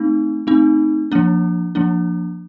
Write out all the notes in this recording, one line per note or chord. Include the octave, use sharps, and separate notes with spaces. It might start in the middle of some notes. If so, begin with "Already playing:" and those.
Already playing: A3 C4 D#4
A3 C4 D#4
F3 A#3 D4
F3 A#3 D4